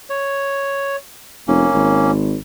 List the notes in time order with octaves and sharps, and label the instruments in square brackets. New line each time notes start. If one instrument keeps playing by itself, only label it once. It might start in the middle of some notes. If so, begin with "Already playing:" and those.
[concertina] C#5
[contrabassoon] F1 [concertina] A#3 C#4
[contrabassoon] G#1